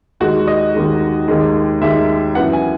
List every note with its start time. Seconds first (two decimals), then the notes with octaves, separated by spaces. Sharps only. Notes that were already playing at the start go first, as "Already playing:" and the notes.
0.20 D#2 D#3 G#3 F#4
0.47 D#5
0.74 D#2 D#3 G#3
1.28 D#2 D#3 G#3
1.81 D#2 D#3 G#3 E5
2.35 F#2 E3 B3 E4 F#5
2.53 G#5